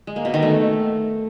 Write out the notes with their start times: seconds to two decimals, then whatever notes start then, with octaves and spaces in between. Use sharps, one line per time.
0.07 G#3
0.16 A#3
0.25 B2
0.34 D#3
0.42 A3